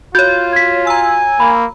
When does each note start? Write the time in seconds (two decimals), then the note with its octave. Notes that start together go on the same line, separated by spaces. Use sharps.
0.15 F4 F#4 C#5 G6
0.53 G#6 B6
0.87 G#5 A#5 E6
1.40 A#3 B5